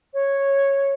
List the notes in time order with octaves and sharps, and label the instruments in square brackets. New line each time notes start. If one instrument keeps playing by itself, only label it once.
[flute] C#5